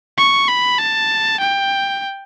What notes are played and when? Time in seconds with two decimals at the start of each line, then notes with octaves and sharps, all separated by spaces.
0.18 C#6
0.48 B5
0.79 A5
1.40 G5